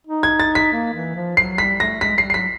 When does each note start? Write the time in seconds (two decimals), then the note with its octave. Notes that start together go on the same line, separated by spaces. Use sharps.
0.07 D#4
0.23 G#6
0.40 A6
0.55 B6
0.72 A#3
0.94 E3
1.15 F3
1.37 F#3 C7
1.58 G3 B6
1.80 A3 A#6
2.01 G#3 B6
2.18 G3 C7
2.30 C7
2.34 F#3 B6